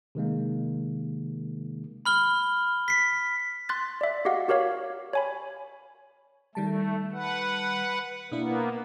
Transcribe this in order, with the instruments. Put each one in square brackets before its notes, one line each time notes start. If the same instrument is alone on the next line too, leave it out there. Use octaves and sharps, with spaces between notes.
[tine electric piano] C3 D#3 G#3 A#3
[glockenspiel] B5 F6 G7
B6 C7
[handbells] C6 F#6 A6
D5 E5
F#4 G4 D#5 F5 F#5
F#4 G4 A#4 C#5 F5
C#5 G#5 B5
[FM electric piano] D#3 G3 A5 [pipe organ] A3
[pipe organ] B4 F#5
[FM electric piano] B2 D4 E4 [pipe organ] A#3 B3